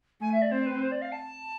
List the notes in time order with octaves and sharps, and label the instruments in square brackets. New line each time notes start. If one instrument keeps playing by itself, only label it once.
[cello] A3 [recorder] G#5
[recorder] E5
D5
[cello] C4 [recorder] C5
[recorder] B4
C5
D5
F5
A5